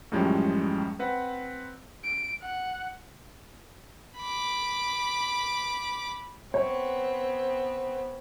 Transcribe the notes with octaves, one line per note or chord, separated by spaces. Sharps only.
F#2 A2 F3 G3 G#3 C#4
C4 B4 F#5
D7
F#5
B5 D6
B3 C4 C#5